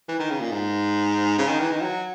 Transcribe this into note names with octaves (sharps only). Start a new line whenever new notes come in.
E3
D#3
C#3
A#2
G#2
C#3
D#3
E3
D#3
F#3